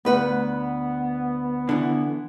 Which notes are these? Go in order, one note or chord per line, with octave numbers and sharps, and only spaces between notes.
D2 B3 B4 F#5
D3 E3